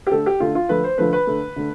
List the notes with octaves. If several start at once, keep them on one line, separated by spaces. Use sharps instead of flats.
G4
D3 A3 A4
G4
D3 A3 F4
F4
D3 F3 A3 B4
C5
D3 F3 A3 B4
B4
D3 A3
D3 A3